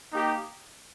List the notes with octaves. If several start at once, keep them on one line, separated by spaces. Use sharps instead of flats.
A#3 D#4 G4